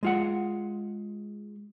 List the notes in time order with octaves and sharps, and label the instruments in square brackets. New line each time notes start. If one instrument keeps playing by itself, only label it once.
[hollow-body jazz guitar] G#3 F4 F#5